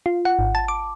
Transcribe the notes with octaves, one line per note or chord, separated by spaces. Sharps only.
F4
F#5
G#1
A5
D6